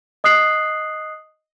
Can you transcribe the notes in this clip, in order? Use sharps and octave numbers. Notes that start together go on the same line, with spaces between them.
D#5 D#6 F#6 C7 F#7